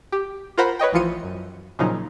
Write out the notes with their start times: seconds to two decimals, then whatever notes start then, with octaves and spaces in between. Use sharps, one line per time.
0.12 G4
0.58 F4 A#4 C5 F#5 A#5 B5
0.79 B4 C#5 D#5 G5
0.93 A1 E3 F3 F4 C#7 D#7
1.23 F#2
1.79 A#2 C#3 F3 F#3 D#4